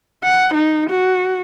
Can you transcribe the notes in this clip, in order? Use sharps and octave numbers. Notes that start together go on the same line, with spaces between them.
F#5
D#4
F#4